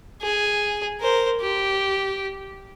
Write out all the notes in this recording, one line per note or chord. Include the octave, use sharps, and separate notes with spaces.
G#4
A#4 C5
G4